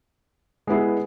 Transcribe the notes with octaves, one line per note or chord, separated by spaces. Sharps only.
G#3 B3 E4 G#4